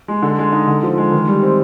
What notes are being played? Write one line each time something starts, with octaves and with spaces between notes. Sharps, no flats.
G#3
D3
G#3
D#4
D3
F3
G#3
D#3
G3
C4